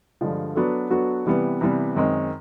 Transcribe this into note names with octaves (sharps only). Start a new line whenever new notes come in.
G2 D3 F3 G#3
F#3 B3 D4 F#4 A4
F#3 B3 D4 F#4 A4
C3 E3 G3 B3
C3 E3 G3 B3
F#2 D#3 G#3 C4